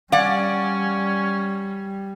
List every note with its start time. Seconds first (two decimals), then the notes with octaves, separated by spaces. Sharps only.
0.12 G3 C#4 D5 F5 F#5